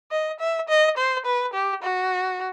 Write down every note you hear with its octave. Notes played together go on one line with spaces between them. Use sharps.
D#5
E5
D#5
C5
B4
G4
F#4